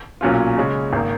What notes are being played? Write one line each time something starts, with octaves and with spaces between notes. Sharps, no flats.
B1 A#2 F#3 C#4 F4
C#3 G#3 C#4
G#1 D#3 A#3